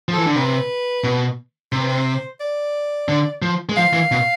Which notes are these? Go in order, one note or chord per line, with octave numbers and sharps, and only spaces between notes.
F3
A4
E3
D3
C3 B4
B2
C3 C5
B4
C5
D5
D3
F3
G#3
F3 F5
E3
B2